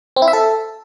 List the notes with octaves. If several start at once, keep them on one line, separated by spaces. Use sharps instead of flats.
C4
E4
E5
A4